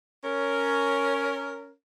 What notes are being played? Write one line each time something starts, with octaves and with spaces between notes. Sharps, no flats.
C#4 A#4